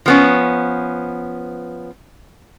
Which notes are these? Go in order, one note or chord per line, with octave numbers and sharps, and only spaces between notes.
F3 B3 C#4